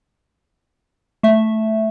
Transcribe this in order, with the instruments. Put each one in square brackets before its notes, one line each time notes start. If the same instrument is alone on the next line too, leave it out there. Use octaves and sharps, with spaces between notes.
[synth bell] A3 E5